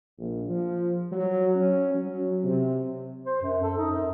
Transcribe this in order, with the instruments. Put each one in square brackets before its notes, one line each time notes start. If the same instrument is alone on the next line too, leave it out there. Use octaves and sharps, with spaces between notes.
[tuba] A#1
F3
F#3
C#4
F#3
C3
[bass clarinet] C5
F#2
A4
D#4
F#2